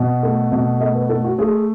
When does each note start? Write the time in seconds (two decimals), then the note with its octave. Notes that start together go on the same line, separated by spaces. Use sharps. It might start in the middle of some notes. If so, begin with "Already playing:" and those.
Already playing: B2
0.23 A3
0.52 B2
0.80 A3 D#5
0.95 B4
1.09 A3 A4
1.24 F#4
1.38 A3 G#4